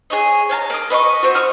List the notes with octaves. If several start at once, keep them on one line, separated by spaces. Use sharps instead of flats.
G#4 C#5 D#5
C#5 F5 A5 A#5
A#3 D#6
B4 D#5 B5 C#6
C4 F#4
F#5 C#6 D#6 F6